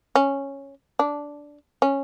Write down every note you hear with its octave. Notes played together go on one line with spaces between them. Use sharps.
C#4
D4
C#4